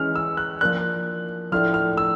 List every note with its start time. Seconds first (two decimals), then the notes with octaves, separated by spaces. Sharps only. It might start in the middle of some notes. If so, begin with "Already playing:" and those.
Already playing: E3 G#3 C#4 F6
0.15 E6
0.37 F#6
0.61 F3 A#3 D4 F#6
1.52 A2 F3 A3 D4 F6
1.74 F6
1.97 E6